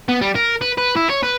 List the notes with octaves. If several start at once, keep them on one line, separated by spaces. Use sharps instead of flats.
B3
G3
A#4
B4
B4
E4
C#5
B4